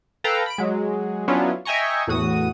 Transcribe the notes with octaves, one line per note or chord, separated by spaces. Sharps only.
A4 B4 F5 G5 A#5
B5 D7
F#3 G#3
F#3 B3 C#4 D4 E4 F4
D#5 E5 G5 G#5 A#5 C#6
E2 A2 F#4 D#6